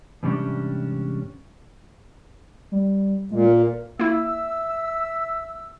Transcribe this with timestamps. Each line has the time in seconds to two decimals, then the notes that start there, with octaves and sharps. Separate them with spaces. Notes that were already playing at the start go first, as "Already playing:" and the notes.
0.23 E2 G#2 C3 G3 C#4 D4
2.72 G3
3.31 A#2 G#3
3.45 A#4
3.99 A#3 E4 E5 E6